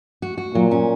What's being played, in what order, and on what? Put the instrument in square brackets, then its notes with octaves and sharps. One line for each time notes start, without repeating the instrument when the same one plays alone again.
[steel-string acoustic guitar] F#4
F#4
[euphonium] A#2 [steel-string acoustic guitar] F#3
[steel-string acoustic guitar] C#4